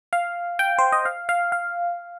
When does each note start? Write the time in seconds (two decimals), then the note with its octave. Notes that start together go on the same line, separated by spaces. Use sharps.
0.13 F5
0.59 G5
0.79 C5
0.92 D#5
1.05 F5
1.29 F5
1.52 F5